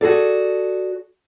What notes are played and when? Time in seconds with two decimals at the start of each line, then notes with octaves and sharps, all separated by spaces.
0.01 F#4 G#4 A4 D5